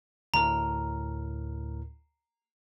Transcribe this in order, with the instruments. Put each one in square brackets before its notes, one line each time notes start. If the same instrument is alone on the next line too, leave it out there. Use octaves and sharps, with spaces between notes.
[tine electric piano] D2 A2 A#4 [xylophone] A#5